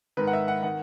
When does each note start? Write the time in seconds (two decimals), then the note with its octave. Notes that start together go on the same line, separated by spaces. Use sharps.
0.17 G#2 D#3 B4
0.27 F#5
0.33 E5
0.48 F#5
0.63 D#3 F#5